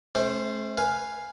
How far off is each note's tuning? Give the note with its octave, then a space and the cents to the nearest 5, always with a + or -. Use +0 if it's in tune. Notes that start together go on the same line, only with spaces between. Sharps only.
A3 -35 C#4 -35 C5 +0
B4 +0 F5 +0 G#5 +0